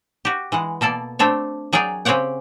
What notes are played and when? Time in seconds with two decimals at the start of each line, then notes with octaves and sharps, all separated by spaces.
0.25 F#4 G4
0.52 E3 G#3 F#5
0.81 B2 A#3 A4 D5
1.19 A3 C4 D4 C#5
1.73 F#3 G#4 A#4 D5 G5
2.05 C#3 C4 G4 C#5 F#5 G5